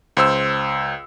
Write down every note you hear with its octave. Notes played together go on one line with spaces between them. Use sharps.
C#2 C5 E6